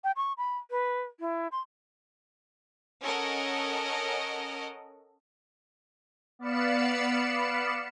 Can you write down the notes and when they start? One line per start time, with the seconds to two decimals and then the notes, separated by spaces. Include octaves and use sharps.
0.04 G5
0.17 C#6
0.38 B5
0.71 B4
1.20 E4
1.52 C6
3.02 C#4 A4 A#4 D#5 F#5
6.39 B3 D5 F5 B5 C#7 E7